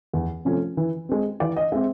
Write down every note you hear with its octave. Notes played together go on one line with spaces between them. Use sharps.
E2
C3 F3 A3 C#4
E3
G#3 C4
E3 D5
D#5
G#3 C4 E5